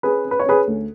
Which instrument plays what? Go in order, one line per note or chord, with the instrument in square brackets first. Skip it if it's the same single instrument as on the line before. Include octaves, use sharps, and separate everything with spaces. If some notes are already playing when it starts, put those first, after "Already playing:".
[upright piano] C#4 G#4 B4
C#4
B4
C#5
C#4 G#4 B4
D2